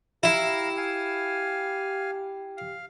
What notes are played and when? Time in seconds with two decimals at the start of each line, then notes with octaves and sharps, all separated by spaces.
0.23 E4 G4 F5 A#5
0.77 F5 G#5
2.57 F5